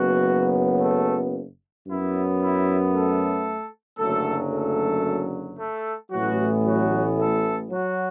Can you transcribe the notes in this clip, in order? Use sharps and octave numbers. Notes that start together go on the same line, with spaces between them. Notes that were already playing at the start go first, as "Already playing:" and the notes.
Already playing: F#1 F#2 F#3 B3 F#4
A3 A4
F#2 F#3 B3 E4
E4
A3 A4
F#1 F#2 D3 F#3 A3 A4
A3 A4
A3 A4
A1 A2 E3 F#3 B3 F#4
F#3 F#4
A3 A4
F#3 F#4